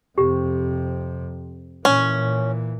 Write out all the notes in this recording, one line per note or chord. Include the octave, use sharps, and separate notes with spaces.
F2 C3 G4
A#2 E3 C#4